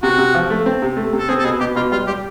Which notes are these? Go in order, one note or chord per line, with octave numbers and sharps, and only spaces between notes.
C3 F#4
C3
F3
A3
C4
C3
A3
C3
A4
C4 G#4
A4
B2 G#4
B2 G4
B2 F4
G3 F4
G3 G4